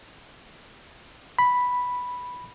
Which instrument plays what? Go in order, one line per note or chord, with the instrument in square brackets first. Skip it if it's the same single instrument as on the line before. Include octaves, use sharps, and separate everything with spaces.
[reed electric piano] B5